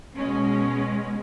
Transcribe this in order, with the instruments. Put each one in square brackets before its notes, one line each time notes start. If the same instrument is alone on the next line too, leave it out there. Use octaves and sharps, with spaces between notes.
[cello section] B2 G#3 C#4